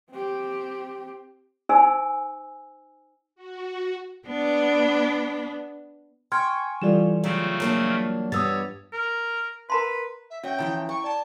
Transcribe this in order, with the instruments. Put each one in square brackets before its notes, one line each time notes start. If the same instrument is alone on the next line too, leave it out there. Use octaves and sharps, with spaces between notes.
[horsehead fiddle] C4 G4
[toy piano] D#4 C5 G#5 E6
[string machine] F#4
[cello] B3 D4
[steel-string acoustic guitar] G5 [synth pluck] G#5 C#6 [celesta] C6 F6 G#6
[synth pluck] E3 G3 F4 [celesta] A4 D5 E7
[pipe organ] C#3 A3 C4 [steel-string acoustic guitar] F#3
[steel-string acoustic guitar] F#3 A#3 D4
[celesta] F6
[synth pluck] G2 [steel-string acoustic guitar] G3 B3 [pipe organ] C#5 [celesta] D#6 E6 A6
[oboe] A#4
[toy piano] A#4 A#5 C6 [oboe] B4
[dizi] E5
[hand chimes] C#4 C#5 E5 [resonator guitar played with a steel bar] F#4 [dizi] G5
[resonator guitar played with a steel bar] B2 E3 F3 [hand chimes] E4 A#5
[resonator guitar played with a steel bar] G5 [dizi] C#6
[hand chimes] D5 [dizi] A5